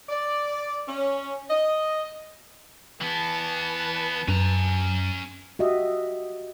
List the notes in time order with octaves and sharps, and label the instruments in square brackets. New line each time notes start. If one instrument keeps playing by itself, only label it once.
[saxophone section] D5
C#4
D#5
[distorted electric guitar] E3 B3 [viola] B4 A5
[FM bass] F#2 [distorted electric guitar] C#4 A#5
[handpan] F#4 G4 D#5 E5